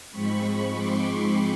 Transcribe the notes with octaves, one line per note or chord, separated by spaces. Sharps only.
G#2 F3 G#3 C4 B5 C#6
C6 D6
B5 C#6